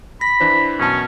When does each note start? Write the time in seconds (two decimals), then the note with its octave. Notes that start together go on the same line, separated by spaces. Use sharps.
0.21 B5 A#6
0.40 E3 D4 C5
0.80 F#2 B2 C#4 A5